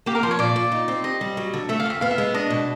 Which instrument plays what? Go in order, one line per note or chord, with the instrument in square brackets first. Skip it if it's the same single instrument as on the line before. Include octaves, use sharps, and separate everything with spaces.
[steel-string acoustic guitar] A#3 [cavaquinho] G4
[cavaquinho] A#4
[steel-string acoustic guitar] F3 [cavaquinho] C5
[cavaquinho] C#5
[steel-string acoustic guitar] A#2 [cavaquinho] D5
[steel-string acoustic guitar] A#2
D#4
C4
[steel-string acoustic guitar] G4 [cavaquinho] D#5
[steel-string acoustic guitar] G3
F#3
D3
[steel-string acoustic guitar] A3 [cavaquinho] E5
[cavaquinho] F5
[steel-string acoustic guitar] F2 [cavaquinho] E5
[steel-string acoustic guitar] B3 [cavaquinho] F5
[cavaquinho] E5
[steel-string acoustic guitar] G#3
[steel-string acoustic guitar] D4 [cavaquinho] D#5
[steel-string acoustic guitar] B2